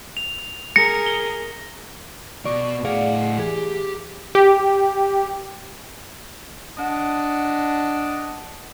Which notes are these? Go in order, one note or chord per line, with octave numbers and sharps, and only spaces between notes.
F7
G#4 A#4 A#6 C#7
G7
B2 D5 C#6
A2 G#4 D5 F5 F#5
E3 G4 G#4
G4
D4 D#5 F#5